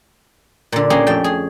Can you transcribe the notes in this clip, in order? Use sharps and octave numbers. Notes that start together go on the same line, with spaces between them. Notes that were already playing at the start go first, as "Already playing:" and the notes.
A#2 D3
A#3 C#4 G4 G#4
F2 A3 G5
G#4